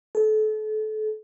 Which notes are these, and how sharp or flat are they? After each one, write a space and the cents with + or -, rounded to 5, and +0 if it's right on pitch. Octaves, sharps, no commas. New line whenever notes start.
A4 -30